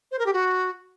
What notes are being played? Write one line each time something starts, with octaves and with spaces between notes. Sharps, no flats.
C5
A#4
G4
F#4